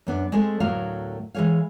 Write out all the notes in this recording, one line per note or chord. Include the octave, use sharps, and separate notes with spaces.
F#2 B3 D4
G#3 A3 C4 G#4 A4 C5
D2 A2 F#3 B3 A#4 F5
E3 G#3 G#4 C#5 F5